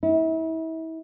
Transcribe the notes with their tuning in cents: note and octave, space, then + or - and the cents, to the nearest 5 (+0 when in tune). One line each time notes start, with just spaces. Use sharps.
E4 -35